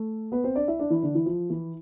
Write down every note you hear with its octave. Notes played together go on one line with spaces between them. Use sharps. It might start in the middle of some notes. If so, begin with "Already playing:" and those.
Already playing: A3 A4
B3 B4
C4 C5
D4 D5
E4 E5
D4 D5
E3 E4
D3 D4
E3 E4
F3 F4
E3 E4